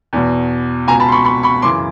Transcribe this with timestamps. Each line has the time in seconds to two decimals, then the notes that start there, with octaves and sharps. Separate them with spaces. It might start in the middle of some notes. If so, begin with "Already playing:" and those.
0.13 E2 B2
0.87 C#2 B2 G#5 A#5
1.00 A5 B5
1.08 C6
1.12 B5 C#6
1.25 B5 C#6
1.43 B5 C#6
1.62 F#2 C#3 E3 C6 D6